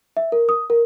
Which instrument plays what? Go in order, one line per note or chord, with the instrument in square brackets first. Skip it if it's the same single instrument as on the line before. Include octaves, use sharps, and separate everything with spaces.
[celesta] E5
A#4
D#6
A#4